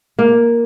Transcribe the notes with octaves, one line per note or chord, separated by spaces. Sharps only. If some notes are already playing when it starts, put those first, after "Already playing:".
A#3